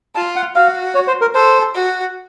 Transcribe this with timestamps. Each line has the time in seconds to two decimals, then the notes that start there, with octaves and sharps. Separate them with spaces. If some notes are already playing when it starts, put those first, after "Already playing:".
0.15 F4 A5
0.36 F#5
0.55 F#4 F5
0.95 C#5
1.07 C5
1.21 A#4
1.35 A4 C5
1.74 F#4